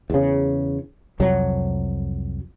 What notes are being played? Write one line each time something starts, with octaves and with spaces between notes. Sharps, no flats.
E2 C#3
C2 F2 F#3